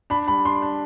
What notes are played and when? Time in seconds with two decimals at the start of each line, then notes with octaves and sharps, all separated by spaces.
0.10 D4 B5
0.28 G3 B5
0.45 D4 C6
0.62 D4